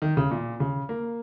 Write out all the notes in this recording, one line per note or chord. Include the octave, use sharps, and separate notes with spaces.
D#3
C#3
A#2
C#3
A#3